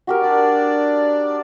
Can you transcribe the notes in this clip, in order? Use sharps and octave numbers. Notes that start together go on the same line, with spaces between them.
F#4 G4 A#4
D4 D5